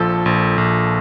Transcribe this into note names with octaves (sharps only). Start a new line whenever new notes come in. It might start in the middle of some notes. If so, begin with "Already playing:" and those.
Already playing: A#1 F3 A4
A#1
A#1